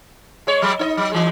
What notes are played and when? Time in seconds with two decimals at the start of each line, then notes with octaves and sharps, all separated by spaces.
0.47 G#3 C#5
0.62 F#3 G#3
0.79 D#4 C#5 D#5
0.97 F#3
1.12 E3 G#3